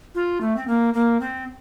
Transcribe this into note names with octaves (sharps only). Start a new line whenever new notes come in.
F4
A3
C4
A#3
A#3
C4